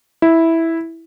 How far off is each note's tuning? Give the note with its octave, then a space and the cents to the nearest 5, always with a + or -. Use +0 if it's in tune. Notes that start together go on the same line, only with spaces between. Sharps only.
E4 -5